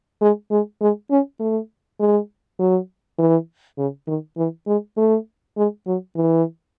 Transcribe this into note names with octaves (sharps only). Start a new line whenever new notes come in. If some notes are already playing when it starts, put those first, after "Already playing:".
G#3
G#3
G#3
C#4
A3
G#3
F#3
E3
C#3
D#3
E3
G#3
A3
G#3
F#3
E3